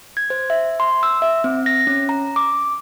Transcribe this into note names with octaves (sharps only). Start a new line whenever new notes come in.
G#6
C5
E5
C6
E6
E5
C4
A#6
C#4
A#5
D6